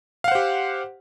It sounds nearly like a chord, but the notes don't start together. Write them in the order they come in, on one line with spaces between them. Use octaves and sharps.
F5 F#5 C5 G4